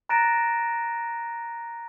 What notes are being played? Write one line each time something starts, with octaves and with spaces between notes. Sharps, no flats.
A#5 F#6 A6 A#6 D7 E7